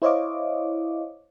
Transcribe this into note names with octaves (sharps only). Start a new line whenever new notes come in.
E4 C5 C#5 D#5 F5 D6